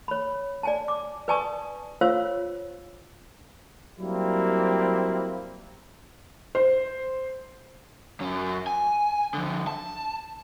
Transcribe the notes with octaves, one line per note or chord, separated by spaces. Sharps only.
C#5 B5
D5 G#5 A5
D6
B4 D5 G#5 A5 C#6 D#6
F4 C5 C#5 F5 E6
F#3 G3 A#3 C4 E4
C5
F#2 C#4
G#5
D3 F3
A5